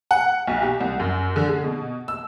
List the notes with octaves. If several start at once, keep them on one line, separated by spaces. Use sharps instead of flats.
F#5
B1
G4
C2
F#2
D3
G#4
B2
E6